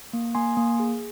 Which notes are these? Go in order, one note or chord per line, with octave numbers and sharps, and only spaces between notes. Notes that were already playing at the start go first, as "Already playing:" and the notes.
A#3
A#3 G#5 C6
A#3
G#4